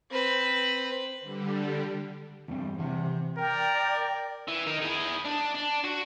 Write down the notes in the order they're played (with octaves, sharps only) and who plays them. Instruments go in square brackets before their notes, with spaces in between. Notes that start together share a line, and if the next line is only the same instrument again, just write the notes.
[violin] C4 B4
[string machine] D3 G3
[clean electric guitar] E2 G2 C4 [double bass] G3
[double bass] C3 [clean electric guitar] E3 F#5
[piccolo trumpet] A#4 [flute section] D5 G5
[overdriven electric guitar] E3
D#4 A#4
E4 G#4
D4
D4
F#4